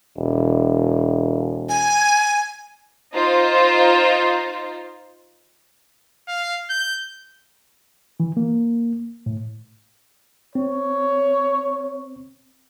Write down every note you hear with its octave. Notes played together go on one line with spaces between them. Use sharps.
E1
G#5
D#4 F4 C5
F5
G6
E3
A#3
A2
C4 C#5